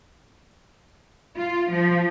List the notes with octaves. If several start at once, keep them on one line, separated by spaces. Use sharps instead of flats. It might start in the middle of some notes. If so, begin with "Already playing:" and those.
F4
F3